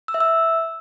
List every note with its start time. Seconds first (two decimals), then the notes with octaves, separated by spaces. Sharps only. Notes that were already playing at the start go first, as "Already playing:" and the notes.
0.08 E6
0.14 E5
0.20 E6